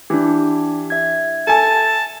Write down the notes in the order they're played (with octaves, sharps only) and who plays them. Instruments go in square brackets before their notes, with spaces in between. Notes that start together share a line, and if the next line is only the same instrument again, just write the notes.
[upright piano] E3 [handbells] D4 G4
[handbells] E5 G#6
[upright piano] A4 G#5 [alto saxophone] A5